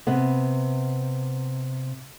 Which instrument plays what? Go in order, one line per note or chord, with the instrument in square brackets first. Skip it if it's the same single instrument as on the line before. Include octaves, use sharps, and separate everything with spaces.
[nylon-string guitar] C3 B3